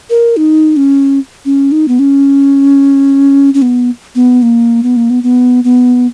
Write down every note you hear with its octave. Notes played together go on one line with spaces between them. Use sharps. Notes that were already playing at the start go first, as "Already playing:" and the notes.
A#4
D#4
C#4
C#4
D#4
B3
C#4
C#4
B3
B3
A#3
B3
A#3
B3
B3
B3